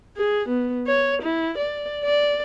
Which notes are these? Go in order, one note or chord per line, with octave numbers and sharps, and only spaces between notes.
G#4
B3
C#5
E4
D5
D5